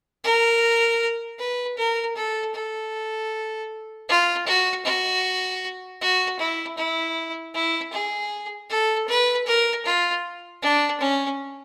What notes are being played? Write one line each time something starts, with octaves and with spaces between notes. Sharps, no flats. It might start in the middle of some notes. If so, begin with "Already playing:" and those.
A#4
B4
A#4
A4
A4
F4
F#4
F#4
F#4
E4
E4
E4
G#4
A4
B4
A#4
F4
D4
C#4